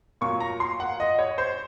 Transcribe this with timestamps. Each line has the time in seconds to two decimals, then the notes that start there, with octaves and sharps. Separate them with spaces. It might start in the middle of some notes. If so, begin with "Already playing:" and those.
0.21 A#2 F#3 C#6
0.40 A#5
0.60 C6
0.80 F#5
1.00 D#5
1.19 C#5
1.38 C5